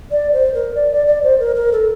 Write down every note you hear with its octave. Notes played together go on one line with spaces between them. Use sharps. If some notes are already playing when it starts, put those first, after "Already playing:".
D5
C5
A#4
D5
D5
D5
C5
A#4
A#4
A4